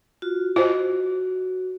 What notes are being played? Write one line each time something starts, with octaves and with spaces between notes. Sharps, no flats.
F4 F#4
F4 F#4 C5 D#5